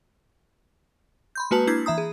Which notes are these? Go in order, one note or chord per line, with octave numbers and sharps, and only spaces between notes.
B5 C6 G6
G#3 A#3 F#4 B4 A5 C#7
A#3 D4 E4 G6 G#6 C7
E3 E5 A#5 D#6
G#4